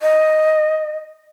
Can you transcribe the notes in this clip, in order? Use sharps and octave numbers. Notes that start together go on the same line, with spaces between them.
D#5